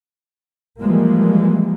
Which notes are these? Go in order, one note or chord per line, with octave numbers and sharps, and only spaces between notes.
E3 F3 G3 G#3 A#3